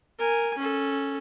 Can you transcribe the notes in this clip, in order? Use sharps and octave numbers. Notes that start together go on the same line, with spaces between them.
A#4 G#5
C#4 A4